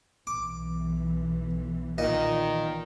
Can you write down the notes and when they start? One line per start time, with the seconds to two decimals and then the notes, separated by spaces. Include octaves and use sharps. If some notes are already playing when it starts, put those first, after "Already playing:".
0.27 B1 E3 D6
1.98 A#2 D#3 D#5